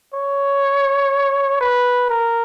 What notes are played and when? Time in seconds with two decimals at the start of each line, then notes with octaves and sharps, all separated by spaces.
0.14 C#5
1.61 B4
2.10 A#4